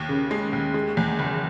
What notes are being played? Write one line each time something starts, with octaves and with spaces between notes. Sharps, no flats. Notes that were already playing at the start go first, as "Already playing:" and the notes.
Already playing: D#2
C#3
G#3
D#2
G#3
E2
F#1